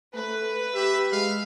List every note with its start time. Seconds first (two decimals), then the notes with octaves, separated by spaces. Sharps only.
0.14 A3 B4
0.75 G4 E5
1.12 G#3 F5